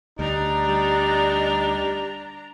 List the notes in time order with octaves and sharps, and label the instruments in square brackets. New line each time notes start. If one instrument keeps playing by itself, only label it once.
[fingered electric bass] D2 [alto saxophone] G3 [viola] D4 A#5 [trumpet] D#4
[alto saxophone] G3